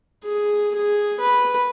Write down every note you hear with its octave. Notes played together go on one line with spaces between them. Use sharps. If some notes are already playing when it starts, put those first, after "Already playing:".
G#4
G#4
B4